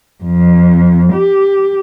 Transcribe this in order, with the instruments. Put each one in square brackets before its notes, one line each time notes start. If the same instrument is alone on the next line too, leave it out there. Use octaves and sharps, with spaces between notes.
[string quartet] F2
G4